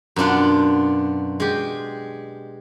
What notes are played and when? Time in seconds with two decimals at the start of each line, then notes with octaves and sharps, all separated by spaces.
0.16 F#2 B2 D4 F4 F#5
1.40 G#3 G4